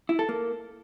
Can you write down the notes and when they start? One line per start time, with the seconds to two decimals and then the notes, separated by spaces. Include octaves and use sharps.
0.09 E4
0.19 A4
0.29 A#3